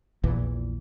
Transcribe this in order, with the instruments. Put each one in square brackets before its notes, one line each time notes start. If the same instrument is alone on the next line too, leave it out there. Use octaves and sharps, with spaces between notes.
[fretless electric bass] A#1 E2 A#2 E3